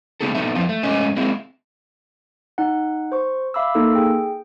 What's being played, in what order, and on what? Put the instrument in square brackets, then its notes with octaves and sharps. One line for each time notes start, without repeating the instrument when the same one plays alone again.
[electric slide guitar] A#2 C#3 B3 D#4 G#4 A4
A#2 B3 D#4 A4 E5
F2 E3 F3 C4 F4
A3
G#2 A3 C#4 C#5 D#5 G#5
G#3 A#3 C4 E4
[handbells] D#4 F#5
C5 C#6
E5 F5 B5 D6 E6
A#3 D#4 A4 E6
G#4 G5